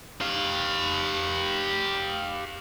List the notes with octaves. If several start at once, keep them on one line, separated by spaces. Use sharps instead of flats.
G4 F5